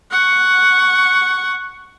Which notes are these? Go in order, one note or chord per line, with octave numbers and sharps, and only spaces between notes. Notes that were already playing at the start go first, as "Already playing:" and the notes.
F#5 C#6